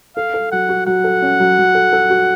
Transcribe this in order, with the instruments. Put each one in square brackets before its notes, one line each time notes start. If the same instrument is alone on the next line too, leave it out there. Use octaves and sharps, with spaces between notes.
[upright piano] A4 [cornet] F5
[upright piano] A4
[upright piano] F#3 [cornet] F#5
[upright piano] F#4
[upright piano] F#3 [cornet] F#5
[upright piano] A4
C#4
F#3
F#3
A4
A4
F#4